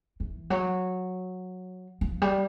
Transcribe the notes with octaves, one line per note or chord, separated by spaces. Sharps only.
E3
F#3
F3
G3